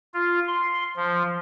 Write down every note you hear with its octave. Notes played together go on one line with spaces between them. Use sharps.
F4
C6
F3